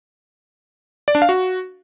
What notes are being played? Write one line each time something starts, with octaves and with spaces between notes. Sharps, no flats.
D5
D4
F5
F#4